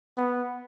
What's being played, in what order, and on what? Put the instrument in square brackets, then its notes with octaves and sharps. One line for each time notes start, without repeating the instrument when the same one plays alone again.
[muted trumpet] B3